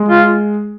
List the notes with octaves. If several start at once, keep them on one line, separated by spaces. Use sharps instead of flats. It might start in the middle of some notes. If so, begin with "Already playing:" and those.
Already playing: G#3
F4